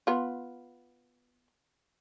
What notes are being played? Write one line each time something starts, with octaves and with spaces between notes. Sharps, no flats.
B3 F4